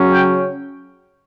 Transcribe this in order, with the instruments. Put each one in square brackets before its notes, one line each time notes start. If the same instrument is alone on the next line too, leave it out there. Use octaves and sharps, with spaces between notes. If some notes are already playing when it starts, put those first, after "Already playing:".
Already playing: [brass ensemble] C#3 F#3 C#4
G5